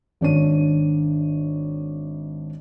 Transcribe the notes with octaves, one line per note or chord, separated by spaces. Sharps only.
G#1 D4 C#5 D#7